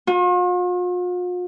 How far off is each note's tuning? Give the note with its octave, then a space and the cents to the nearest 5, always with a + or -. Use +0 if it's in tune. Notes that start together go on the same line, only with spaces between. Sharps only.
F4 +45